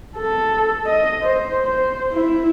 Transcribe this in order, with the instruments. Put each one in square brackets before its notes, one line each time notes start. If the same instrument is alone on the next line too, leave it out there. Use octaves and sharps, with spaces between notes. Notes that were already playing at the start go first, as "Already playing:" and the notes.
[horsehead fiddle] A4
D#5
C5
C5
E4